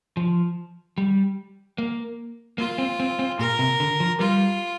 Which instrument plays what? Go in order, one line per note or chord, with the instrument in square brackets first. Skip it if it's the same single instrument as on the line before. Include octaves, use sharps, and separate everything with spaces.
[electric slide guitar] F3
G3
A#3
[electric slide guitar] A#3 [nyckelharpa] F4
[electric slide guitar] C4
C4
C4
[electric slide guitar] A#2 [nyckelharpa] A#4
[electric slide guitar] C3
D3
F3
[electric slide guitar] G3 [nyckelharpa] F4